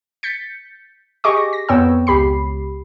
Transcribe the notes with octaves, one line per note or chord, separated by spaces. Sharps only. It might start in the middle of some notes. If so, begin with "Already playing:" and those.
G6 A6 B6 C#7
G4 G#4 D#5 C#6 D6
A#6
A#6
F2 B3 C#5 G5 E6
C#2 G4 B5 C7